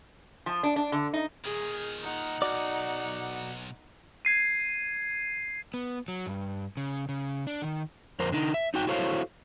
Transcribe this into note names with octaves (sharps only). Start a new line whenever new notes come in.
F3
D4
D4
D3
D#4
A#2 D#3 G#4
D#4 F#5
B1 F#4 D5
G#6 C7 D#7
B3
F#3
G2
C#3
C#3
D4
D#3
F2 A#4 C5
D3 D#4
E5
D#4 F#4 G5
E4 F#4 A4 C5 C#5 F5